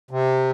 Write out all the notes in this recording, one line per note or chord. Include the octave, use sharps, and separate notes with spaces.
C3